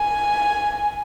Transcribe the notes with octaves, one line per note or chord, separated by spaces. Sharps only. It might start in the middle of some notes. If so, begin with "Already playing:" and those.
Already playing: G#5